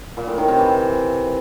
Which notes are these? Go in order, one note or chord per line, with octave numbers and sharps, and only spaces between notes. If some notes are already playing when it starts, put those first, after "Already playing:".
A#2
A2
D#3
C3
E3